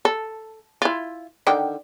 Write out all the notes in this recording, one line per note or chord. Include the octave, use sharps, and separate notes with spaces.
A4
E4 F4
D3 D#3 G5